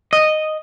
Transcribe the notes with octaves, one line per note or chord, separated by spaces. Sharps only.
D#5